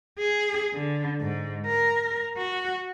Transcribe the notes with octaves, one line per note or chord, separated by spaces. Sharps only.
G#4
D3
G#2
A#4
F#4